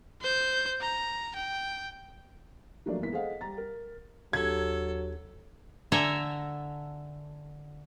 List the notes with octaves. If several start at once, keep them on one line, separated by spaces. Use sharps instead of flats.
C5 G6
A#5
G5
F3 F#3 A3 A#3 D4 D5
E1 A#3 B3 E4 B6
G#4 A4 C5 D#5 F5 F#5
G3 A#5 A6
A#4
D#2 F#3 D4 G4 A4 G#6
D3 A4 E5 G#5 A#5